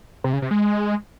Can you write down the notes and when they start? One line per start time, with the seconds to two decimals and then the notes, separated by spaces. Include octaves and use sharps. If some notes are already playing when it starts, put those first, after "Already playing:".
0.24 C3
0.33 C#3
0.42 C3
0.51 G#3